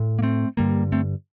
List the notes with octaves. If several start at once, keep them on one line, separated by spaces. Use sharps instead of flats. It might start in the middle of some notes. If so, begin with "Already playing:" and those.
Already playing: A2
A#3
A3 C4
G2 D3 G3 A#3
A3 C4